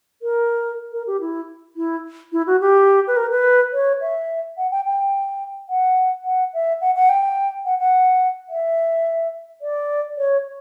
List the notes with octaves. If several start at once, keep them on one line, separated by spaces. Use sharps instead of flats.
A#4
A#4
G4
E4
E4
E4
F#4
G4
B4
A#4
B4
C#5
E5
F#5
G5
G5
F#5
F#5
E5
F#5
F#5
G5
F#5
F#5
E5
D5
C#5